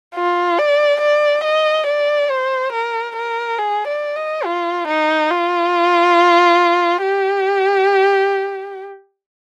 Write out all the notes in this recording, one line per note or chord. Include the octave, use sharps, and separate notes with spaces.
F4
D5
D5
D#5
D5
C5
A#4
A#4
G#4
D5
D#5
F4
D#4
F4
G4